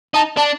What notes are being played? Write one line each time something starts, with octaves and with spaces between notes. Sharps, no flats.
D#4 A5
D4 A5